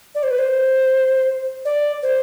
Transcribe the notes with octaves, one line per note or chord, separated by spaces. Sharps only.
D5
C5
B4
C5
D5
C5